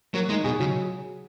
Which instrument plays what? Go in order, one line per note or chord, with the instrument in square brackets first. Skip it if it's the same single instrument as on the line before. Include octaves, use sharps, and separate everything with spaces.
[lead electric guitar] F#3 [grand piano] A#3
[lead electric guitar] G#3 [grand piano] D#4
[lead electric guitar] B2 [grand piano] G#4
[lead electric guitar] C#3 [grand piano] F#3